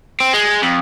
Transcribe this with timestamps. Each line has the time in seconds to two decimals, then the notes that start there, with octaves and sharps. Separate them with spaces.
0.20 C4
0.33 G#3
0.62 F2